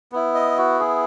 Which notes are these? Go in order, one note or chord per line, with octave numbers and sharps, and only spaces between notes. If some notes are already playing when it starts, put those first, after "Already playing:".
B3 E4
D#5
F#4
G#4